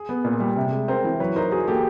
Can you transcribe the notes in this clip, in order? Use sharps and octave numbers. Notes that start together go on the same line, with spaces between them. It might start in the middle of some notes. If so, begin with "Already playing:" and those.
Already playing: G#4
B3
A#2
G3
C3
G#3
C4 A#4 C5
E3
F#3 B4 C#5
D#4 A#4 C5
F#4 G#4 A#4
A#3 G4 A4